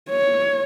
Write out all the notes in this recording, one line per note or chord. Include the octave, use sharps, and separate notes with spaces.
C#5